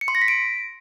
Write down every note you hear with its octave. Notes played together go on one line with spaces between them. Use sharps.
C#7
C6
A#6
B6
D7